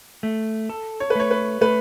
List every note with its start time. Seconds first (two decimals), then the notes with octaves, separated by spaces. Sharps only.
0.23 A3
0.69 A4
1.00 C#5
1.10 B4
1.15 A3 C#5
1.31 B4
1.61 A3 B4